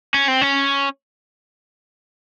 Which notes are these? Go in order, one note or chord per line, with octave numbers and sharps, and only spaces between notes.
C#4
C4
C#4